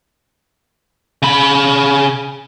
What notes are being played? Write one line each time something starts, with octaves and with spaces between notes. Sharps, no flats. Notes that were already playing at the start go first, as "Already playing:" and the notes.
C#3 B5